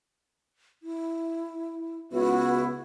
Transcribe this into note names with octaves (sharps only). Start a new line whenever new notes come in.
E4
C#2 B3 E4 F#4